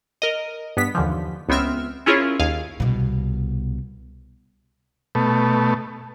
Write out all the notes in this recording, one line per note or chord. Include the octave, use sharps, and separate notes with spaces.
A#4 D#5
G2 B3 B6
D#2 D3 E3 F3
C#2 B3 C4 E5 F6
C#4 E4 F4 G#4 A#4 C#5
D#2 G#4 F5
C2 B2
B2 A3